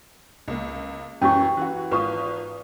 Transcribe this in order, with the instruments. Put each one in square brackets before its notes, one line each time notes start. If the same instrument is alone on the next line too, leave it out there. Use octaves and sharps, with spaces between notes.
[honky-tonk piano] C#2 A#3
[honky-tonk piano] F#2 E3 F#3 [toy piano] C#4 G4 C#6
[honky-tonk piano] E3 F#4
[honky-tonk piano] G#1 F4 D#6 [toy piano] B4 C#6